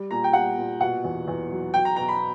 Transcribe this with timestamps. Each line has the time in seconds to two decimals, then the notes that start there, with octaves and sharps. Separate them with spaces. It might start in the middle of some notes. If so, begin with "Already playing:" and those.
Already playing: G3
0.11 A#2 A#5
0.24 G5
0.33 G3 F#5
0.57 A#2
0.80 B2 F#5
1.04 E2
1.28 E2
1.50 F#3
1.74 F#3 G5
1.85 A#5
1.96 B2 A#5
2.08 B5